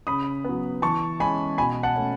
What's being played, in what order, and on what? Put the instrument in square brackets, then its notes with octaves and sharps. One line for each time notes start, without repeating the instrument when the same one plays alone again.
[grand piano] C#3 B5 D#6
F#3 B3
E3 A5 C#6
G#3 C#4 G#5 B5
B2 G#5 B5
F#5 A5
A3 C#4